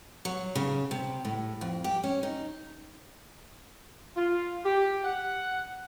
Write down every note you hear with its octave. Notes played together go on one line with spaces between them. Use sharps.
F#3
C#3
C3
A2
F2
G4
C#4
D#4
F4
G4
F#5